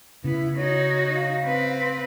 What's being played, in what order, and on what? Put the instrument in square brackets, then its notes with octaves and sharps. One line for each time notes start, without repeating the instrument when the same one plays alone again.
[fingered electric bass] C#3 [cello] B3 [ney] E4
[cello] D#4 F#4 [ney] C#5
[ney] F5
[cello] C4 B4